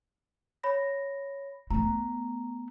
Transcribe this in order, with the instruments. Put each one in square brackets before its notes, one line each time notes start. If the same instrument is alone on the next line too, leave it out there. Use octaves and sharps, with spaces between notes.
[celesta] C#5 B5 A#6
[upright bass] A3 B3 [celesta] A#5